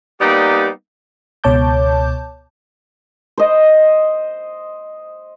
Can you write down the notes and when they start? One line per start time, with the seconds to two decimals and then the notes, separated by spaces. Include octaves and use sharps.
0.21 G3 A#3 B3 D#4 G4 D5
1.44 C#2 B2 C#5 A5 D6 G6
3.38 C5 D#5